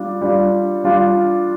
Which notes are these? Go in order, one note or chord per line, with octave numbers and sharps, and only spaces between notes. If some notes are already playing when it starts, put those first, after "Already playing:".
Already playing: G3 D4 F4
G3 D4 F4
G3 D4 F4